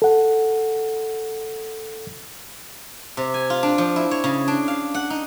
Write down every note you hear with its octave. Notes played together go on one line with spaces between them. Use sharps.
A4 F#5
C3
G#5
F4
D4
F3
E4
C#5
C#3
D4
F5
F#5
D#4